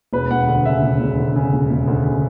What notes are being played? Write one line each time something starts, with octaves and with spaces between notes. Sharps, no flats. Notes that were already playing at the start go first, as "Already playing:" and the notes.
E1 B4
E1 F#5
D2 F#5
C#3 E5
E1
E1
D2
C#3
E1
E1
D2
C#3